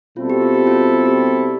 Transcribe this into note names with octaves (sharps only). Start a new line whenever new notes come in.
B2 G3 C4 E4 F4 A4
G4
F4
G4
F4
G4